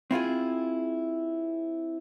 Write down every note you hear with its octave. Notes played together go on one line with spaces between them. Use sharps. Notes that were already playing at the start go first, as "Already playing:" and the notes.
C4 E4 F4 G#4